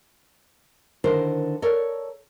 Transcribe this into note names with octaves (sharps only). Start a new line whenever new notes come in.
D3 D#3 E4 A#4 C5
A4 A#4 C#5 D5